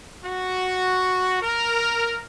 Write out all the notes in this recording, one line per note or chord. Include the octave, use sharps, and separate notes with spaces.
F#4
A#4